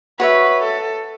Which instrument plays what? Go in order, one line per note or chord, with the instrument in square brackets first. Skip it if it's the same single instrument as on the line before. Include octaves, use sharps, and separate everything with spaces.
[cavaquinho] F#4 C#5 E5 [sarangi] B4
[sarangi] A4